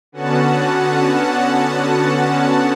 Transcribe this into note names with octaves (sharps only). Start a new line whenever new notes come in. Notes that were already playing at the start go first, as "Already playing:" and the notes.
D3 B3 C#4 F#4 F#5 A5